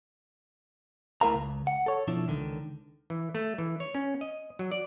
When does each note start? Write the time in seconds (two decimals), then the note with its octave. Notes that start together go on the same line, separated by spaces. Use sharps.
1.21 C#2 A3 E4 A#4 F5 A#5
1.35 C#2
1.67 F#5
1.86 A4 C#5
2.08 B2 F3 D4 E4
2.28 C#2 D3 D#3
3.10 E3
3.35 A3
3.58 E3
3.80 C#5
3.95 C#4
4.21 D#5
4.59 F#3
4.72 D5